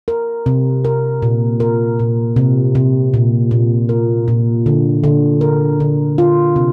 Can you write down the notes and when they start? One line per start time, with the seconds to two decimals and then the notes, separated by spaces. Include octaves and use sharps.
0.08 A#4
0.46 C3
0.85 A#4
1.22 A#2
1.60 A#4
1.99 A#2
2.36 C3
2.75 C3
3.14 A#2
3.51 A#2
3.89 A#4
4.28 A#2
4.66 D3
5.04 D3
5.41 A#4
5.80 D3
6.18 F4
6.56 C3